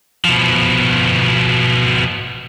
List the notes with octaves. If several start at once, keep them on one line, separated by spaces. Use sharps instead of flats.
B2 F3